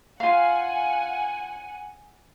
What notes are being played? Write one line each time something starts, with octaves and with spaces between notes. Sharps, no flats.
F4 F5 F#5 G#5